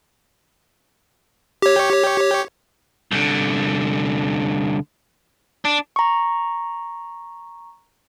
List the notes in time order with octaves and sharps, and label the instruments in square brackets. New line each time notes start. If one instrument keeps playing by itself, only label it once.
[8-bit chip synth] G4 C#5
[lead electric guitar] C2 D3
D4
[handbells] A#5 C#6